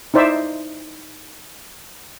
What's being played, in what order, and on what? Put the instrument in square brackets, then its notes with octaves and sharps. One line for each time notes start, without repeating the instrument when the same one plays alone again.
[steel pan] D#4 E4 C5 D5 E5